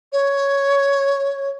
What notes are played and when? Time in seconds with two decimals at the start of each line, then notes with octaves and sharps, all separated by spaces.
0.12 C#5